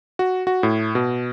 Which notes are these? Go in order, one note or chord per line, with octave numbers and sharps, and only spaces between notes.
F#4
F#4
A2
B2